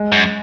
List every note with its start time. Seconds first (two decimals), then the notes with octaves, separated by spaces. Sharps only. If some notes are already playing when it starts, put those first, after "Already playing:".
Already playing: G#3
0.12 F#2